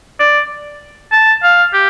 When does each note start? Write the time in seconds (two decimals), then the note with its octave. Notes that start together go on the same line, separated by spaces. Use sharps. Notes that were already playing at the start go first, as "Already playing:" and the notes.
0.19 D5
1.12 A5
1.43 F5
1.73 G4